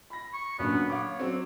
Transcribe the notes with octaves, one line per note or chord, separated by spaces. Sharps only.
B5 A#6
C#6
F#2 A#2 D3 B3
C#5 F5 F#5 D6
F#3 C4